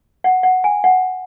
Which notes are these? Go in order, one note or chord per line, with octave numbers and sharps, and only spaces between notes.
F#5
F#5
G#5
F#5